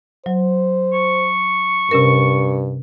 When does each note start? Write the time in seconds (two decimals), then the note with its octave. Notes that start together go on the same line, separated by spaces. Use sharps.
0.26 F#3 C5
0.93 C#6
1.91 G2 C3 C#4 A#4